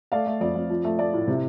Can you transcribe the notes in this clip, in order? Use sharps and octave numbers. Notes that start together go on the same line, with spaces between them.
A3 D5 F5
A3
F2 D5
F2
F3
A3
A3 D5
A2
C3